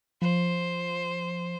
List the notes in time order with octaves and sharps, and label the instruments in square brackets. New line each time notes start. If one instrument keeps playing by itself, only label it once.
[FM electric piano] F3 [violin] C5